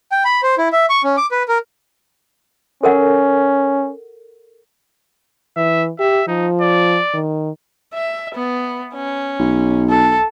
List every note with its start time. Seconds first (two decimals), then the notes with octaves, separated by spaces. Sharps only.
0.12 G5
0.25 B5
0.43 C5
0.58 E4
0.72 E5
0.90 C#6
1.04 C#4
1.17 D6
1.31 B4
1.48 A#4
2.83 C#4 A4 A#4 F#5
5.57 E3 E5
5.99 G4 E5
6.28 F3 D#4
6.61 D5
7.14 D#3
7.94 E5
8.35 B3
8.94 C#4
9.39 B1
9.90 A4